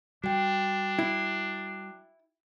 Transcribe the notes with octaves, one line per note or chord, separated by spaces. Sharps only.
G3 D4 F#4 G5
E4